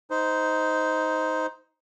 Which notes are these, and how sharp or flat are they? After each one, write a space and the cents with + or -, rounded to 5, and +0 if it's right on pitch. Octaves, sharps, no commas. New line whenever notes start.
D#4 +15 C5 -10